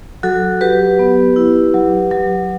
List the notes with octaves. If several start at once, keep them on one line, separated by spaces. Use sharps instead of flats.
F#3 F#4 A4
F#3 G4 B4
B3
E4
F#3
F#3